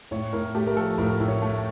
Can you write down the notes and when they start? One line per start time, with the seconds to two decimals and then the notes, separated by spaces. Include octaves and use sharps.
0.11 A2 C#5
0.33 A2 A#4
0.55 A3 G4
0.67 A#4
0.77 F3 A4
0.98 A2 A#4
1.20 A2
1.28 C#5
1.42 A3